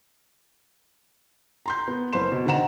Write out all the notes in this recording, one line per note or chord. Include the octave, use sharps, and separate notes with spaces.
A#5 C6 G6
B3
F#1 B4 C5 C6 E7
B2
D3 D#3 C5 F#5 A#5 E7